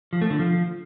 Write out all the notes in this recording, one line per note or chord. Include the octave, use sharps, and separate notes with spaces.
F3
A3
D3
F3